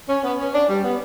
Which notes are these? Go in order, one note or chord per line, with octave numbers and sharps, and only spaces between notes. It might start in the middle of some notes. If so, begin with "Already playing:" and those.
C#4
B3
C#4
D4
G3
B3